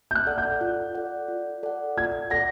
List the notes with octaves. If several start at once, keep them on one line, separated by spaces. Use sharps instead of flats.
G6
F#6
A4 D5 F#5
G6
F4
A4 D5 F#5
F4
A4 D5 F#5
F4 G#6
A4 D5 F#5 A#6